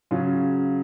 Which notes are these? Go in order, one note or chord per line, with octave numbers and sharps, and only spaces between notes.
C#3 F#3 C#4 F4